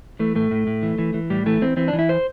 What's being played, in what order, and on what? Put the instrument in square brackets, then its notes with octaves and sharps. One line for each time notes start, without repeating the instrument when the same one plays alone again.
[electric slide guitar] E3 A3
A2 A3
A2
A2
E3
E3
E3
A2 G3
E3 A3
E3 C4
E3 C4
D4
E3
E4
C5